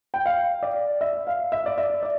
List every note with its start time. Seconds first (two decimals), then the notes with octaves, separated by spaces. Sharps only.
0.14 G5
0.26 F5
0.63 D5
1.01 E5
1.27 F5
1.52 E5
1.66 D5
1.78 E5
2.03 D5